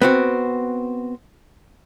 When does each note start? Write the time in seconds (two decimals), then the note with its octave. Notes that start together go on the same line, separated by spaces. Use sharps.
0.02 B3 C4 F#4